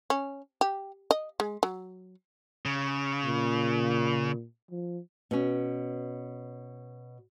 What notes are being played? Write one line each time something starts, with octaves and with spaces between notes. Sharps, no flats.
C#4
G4
D#5
G#3
F#3
C#3
A#2
F3
B2 C#4